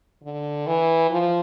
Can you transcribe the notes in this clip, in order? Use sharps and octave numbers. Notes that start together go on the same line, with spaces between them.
D3
E3
F3